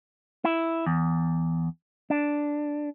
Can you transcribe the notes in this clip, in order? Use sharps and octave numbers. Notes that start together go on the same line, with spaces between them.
E4
E2
D4